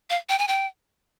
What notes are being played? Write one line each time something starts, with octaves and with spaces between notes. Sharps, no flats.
F5
G5
G#5
G5